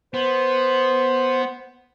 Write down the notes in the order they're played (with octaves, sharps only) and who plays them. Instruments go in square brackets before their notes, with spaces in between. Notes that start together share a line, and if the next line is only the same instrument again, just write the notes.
[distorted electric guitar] B3 [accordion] C5